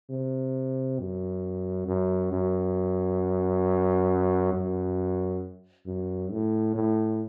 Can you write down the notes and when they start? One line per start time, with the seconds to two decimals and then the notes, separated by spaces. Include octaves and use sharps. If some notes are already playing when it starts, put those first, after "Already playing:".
0.10 C3
0.99 F#2
1.88 F#2
2.32 F#2
4.54 F#2
5.87 F#2
6.32 A2
6.75 A2